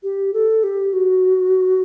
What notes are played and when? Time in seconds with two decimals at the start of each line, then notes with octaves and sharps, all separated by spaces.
0.03 G4
0.34 A4
0.64 G4
0.93 F#4